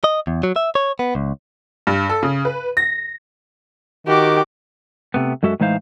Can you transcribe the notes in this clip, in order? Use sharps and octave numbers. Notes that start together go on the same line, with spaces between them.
D#5
E2
F#3
E5
C#5
B3
C#2
G2
A4
C#3
B4
A#6
D#3 F#4 G4 D6
C3 A3 B3
F#2 G#3 F#4 A4 E5
A2 E3 G#3 D#4 C5 F5